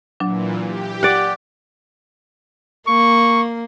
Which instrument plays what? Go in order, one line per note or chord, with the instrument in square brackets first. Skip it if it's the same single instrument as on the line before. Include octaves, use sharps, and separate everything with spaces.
[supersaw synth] A#2 E3 [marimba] F#3 D4
[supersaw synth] G4
[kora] D5 F#5
[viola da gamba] A#3 [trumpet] C#6